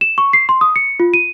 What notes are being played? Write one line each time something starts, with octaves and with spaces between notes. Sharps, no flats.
E7
C#6
C7
C6
D#6
C#7
F4
D#7